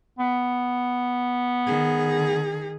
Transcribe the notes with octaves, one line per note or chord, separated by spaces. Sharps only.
B3
D#3 G#4